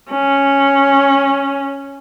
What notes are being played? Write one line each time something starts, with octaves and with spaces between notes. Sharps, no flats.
C#4